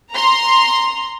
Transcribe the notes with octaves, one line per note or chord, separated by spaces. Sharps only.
A#5 C6